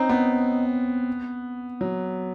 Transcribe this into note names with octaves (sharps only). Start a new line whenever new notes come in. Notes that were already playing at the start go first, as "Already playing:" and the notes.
Already playing: C4 C#4 D#4
B3
F#3